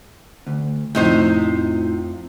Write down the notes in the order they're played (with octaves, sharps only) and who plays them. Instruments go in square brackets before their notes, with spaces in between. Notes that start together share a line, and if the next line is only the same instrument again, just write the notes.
[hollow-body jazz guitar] D2
[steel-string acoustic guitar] F2 F4 A#5 [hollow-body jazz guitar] A2 [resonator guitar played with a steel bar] C3 D#4 C5